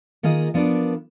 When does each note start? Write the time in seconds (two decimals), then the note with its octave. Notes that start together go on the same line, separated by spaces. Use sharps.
0.23 D#3 A#3 F4 G#4 D#5
0.54 F3 B3 D4 A#4 D5